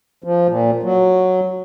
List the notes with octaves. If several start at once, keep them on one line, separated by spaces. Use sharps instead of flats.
F3
A#2
F#3